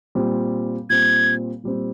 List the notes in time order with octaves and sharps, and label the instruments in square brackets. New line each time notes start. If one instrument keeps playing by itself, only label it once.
[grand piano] A#2 G3 C4
[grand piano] A#2 G3 C4 [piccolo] G#6
[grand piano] A#2 G3 C4